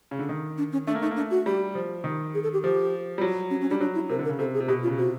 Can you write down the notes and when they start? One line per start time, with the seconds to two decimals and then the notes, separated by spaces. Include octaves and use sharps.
0.11 C#3
0.19 D3
0.29 D#3
0.58 D4
0.72 C#4
0.87 A3 D4
0.95 A#3
1.02 A3 D#4
1.11 A#3
1.17 A3 D4
1.31 F#4
1.46 G3 G4
1.75 F3
2.04 D#3
2.34 G#4
2.43 A4
2.53 G4
2.63 F3 G4
3.18 G3
3.21 F#3
3.51 C#4
3.61 C#4
3.70 G3 D4
3.81 F#3 D4
3.95 E4
4.09 C3 A#4
4.19 D3
4.24 A#4
4.29 C#3
4.39 C3 A4
4.54 G#4
4.60 C3
4.68 B2 G4
4.83 F4
4.86 C#3
4.98 C3 F#4